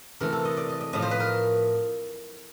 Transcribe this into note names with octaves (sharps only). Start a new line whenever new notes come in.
C3 E3 A3 A#4
A4
D#5
D5
D#5
D#5
A2 F3 A3 D#5
C5
B4
A#4